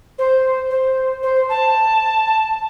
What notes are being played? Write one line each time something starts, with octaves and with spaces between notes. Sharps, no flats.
C5
C5
C5
A5